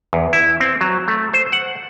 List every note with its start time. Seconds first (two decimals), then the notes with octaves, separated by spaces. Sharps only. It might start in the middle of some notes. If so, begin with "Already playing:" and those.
0.13 E2
0.33 E4
0.60 C4
0.81 F#3
1.08 A3
1.34 C5
1.52 F#5